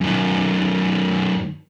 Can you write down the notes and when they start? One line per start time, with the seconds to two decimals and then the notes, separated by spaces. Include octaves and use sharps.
0.01 F#2 D#3